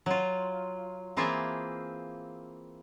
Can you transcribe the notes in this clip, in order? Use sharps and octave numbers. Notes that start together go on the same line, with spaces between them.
F#3 F4
E3 A#3 C4 F4 G#4 E5